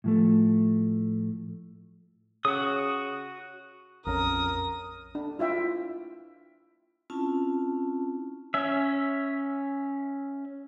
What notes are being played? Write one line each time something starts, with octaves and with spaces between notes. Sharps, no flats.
A2 F3 A3
C#3 F#4 D#6
A#1 F2 C#4 A#4 D#6
D4
E4 F4 E5 G5
C4 C#4 E4 F4 A5
C#4 E5